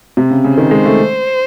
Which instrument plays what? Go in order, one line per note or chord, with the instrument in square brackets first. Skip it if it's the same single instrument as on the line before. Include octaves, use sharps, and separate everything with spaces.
[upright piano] C3
C#3
C#3
[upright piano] D#3 [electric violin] C5
[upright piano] G#3
A3